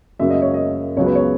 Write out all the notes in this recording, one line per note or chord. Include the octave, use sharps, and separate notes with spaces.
F#2 C#3 F#3 A#3 E5
D#5
C#5
D#5
C#2 C#3 F#3 B3 C#5
B4
C#5